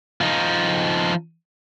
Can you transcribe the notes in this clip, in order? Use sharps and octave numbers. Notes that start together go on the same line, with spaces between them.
F3 D#4